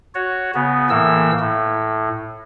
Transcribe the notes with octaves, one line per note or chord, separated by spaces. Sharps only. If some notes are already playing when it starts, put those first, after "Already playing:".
F#4 C#5
C#3 B3
A2 E3 A#3 E6
A2